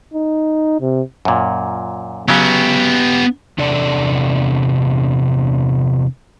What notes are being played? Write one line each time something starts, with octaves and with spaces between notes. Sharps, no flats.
D#4
C3
F#2 A#2
C#3 F#3 B3 G4
E2 C3 D4 A4 D5